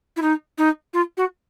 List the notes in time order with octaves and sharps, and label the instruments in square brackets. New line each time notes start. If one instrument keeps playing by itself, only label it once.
[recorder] E4
D#4
D#4
F4
F#4